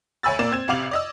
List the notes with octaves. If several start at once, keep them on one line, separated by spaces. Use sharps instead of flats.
D2 C#5 G#5 B5 E6 A6
A#2 A#3 D5 E7
C4 G#6 E7
A1 C3 F5 D6 F7 F#7
D5 D#5 E6